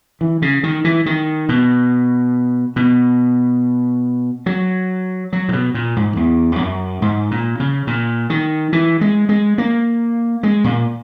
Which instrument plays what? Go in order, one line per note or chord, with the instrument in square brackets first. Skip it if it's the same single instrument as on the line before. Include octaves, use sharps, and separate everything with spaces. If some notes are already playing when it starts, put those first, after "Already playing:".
[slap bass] E3
C#3
D#3
E3
D#3
B2
B2
F#3
F#3
A#2
B2
A#2
G#2
E2
E2
F#2
G#2
A#2
C#3
A#2
D#3
E3
G#3
G#3
A#3
G#3
A#2